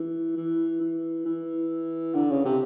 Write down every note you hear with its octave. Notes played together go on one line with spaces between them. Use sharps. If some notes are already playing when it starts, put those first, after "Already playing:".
Already playing: E3
E3
E3
E3
D3
C#3
C3